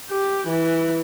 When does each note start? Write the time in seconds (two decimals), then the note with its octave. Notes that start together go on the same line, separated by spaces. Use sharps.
0.10 G4
0.48 E3